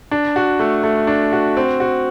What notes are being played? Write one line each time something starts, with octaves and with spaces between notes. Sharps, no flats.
D4
F#4
A3
A3
D4
F#4
C4
F#4